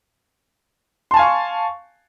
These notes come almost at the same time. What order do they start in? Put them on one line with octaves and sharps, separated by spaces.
C6 A5 G#5 F5 C#6